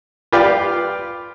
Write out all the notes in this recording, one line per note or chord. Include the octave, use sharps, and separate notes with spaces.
F4 G4 B4 D5 F5 G5